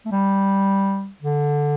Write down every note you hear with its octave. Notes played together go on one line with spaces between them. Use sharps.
A3
G3
D3